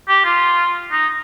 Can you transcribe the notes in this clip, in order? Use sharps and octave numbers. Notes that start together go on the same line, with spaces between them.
G4
F4
D#4